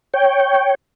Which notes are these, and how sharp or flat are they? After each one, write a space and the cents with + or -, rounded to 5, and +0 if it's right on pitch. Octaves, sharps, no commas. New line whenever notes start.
C#5 +0 G5 -5